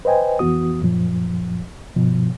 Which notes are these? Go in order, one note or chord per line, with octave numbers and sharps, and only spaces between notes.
B4 C5 D#5 G5 G#5
F2 E3 B3 F#4 D#6
F#2 A#2 F3
G2 B2 F3